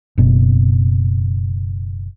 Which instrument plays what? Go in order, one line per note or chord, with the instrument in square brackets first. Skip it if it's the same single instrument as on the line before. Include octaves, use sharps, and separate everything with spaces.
[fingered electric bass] F#1 B2